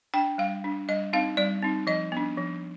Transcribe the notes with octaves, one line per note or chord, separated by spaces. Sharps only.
D4 G5
G3 F5
D4
G3 D#5
C4 D#4 F5
G3 D5
C4 D#4
F3 D#5
B3 D4
F3